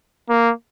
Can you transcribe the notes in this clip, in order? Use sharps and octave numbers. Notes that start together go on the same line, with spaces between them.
A#3